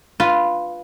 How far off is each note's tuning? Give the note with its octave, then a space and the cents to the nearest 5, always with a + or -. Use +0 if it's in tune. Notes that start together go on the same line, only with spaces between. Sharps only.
F4 +0 B4 +0